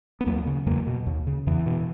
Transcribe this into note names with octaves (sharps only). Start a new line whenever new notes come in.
B3
D#2 F#3 A#3
C#3
E2 F#3 A#3
B2
D#2
C#3
E2 E3
B2